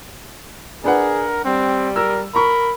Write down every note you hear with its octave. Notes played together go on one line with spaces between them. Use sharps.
D4 G#4 A#4 B4 F#5
G3 C4
A#4 E6
A#4 A#5 B5 C#6